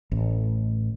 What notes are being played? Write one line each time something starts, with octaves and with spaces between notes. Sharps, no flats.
A1